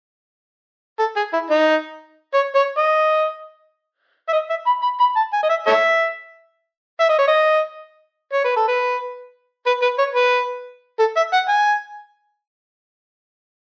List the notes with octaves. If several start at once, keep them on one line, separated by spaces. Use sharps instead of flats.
A4
G#4
E4
D#4
C#5
C#5
D#5
E5
D#5
E5
B5
B5
B5
A5
G#5
D#5
E5
A4 C#5 E5
E5
D#5
C#5
D#5
C#5
B4
A4
B4
B4
B4
C#5
B4
A4
E5
F#5
G#5